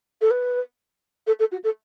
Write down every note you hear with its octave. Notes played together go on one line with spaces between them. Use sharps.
A4
B4
A4
A4
F#4
A4